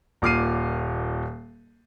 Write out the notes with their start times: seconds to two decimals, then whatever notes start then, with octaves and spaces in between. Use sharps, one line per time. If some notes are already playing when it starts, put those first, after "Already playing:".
0.22 D#1 A#2 D6 F6 C7 D#7